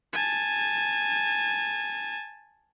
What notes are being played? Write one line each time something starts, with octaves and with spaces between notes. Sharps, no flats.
G#5 A5